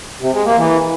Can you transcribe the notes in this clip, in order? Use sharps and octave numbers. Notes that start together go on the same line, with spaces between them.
C3
G#3
A#3
E3